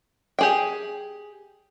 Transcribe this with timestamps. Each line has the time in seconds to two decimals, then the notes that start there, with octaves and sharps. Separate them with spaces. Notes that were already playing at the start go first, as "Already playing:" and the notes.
0.39 G4 G#4 G5